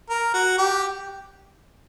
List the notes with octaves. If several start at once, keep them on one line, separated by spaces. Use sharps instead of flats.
A#4
F#4
G4